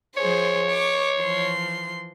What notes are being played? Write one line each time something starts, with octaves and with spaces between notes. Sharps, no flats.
F3 G#4 C5 C#5
C#6 D6
E3 F3 C6